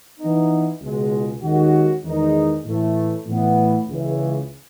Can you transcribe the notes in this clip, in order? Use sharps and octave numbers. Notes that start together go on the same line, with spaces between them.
E3 B3 D#4
C#2 B2 G#3
D#2 D#3 G#3 C#4 F#4
E2 D#3 G#3 D#4
A2 E3 A3
A2 E3 B3
C#2 C#3 E3